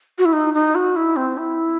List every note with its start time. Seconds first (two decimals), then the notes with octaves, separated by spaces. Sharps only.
0.18 F#4
0.25 E4
0.33 D#4
0.54 D#4
0.75 F#4
0.96 E4
1.16 C4
1.38 E4